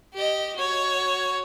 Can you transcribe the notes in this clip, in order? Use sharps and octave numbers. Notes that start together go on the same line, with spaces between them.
G4 D#5
F#4 C#5